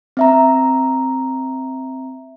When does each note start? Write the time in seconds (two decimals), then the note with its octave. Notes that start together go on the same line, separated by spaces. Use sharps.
0.17 C4 E5 A#5